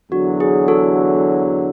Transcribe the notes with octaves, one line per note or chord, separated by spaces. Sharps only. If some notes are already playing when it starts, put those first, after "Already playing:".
E2 D3 F#3 F#4
G#4
F#4 A4